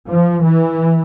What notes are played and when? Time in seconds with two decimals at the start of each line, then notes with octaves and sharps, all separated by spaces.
0.09 F3
0.44 E3